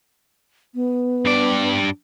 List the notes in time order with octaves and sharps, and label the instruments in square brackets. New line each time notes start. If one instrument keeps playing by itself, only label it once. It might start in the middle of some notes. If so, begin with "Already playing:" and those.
[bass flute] B3
[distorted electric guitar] G2 D5